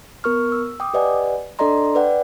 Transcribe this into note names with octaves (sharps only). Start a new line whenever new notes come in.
B3 A#4 C#6 F6
E6
G5 D6 D#6
G4 B4 D5 D#5 F#5 G#5
D4 A4 D5 D#5 A#5 C6
B4 D5 F#5 G5